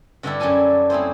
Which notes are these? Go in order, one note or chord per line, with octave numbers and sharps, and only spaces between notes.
G2 D3 G3 D4 E4 A4
F#2 G3 A4 G#5 A5
A3 C4 E4 G#4 C5